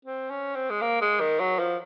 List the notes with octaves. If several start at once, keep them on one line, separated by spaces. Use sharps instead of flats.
C4
C#4
C4
G#3
A#3
G#3
D#3
F#3
F3